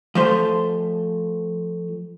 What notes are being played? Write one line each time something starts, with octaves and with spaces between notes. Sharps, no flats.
F3 A3 C5